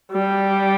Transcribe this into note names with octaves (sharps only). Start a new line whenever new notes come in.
G3